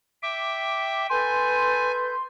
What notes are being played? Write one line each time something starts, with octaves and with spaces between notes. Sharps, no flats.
E5 G5 D6
A4 B4 G#5 C6 G6